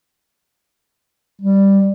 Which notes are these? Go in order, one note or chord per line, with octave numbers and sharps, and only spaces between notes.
G3